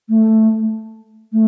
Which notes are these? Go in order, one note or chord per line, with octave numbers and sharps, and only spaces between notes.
A3
A3